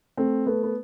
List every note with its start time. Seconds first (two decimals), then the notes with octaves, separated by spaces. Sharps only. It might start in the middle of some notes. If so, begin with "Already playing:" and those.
0.17 A3 C4
0.46 A3 B3
0.63 B3